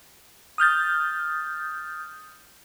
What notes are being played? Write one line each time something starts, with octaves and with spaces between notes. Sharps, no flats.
D#6 F6 G6 A6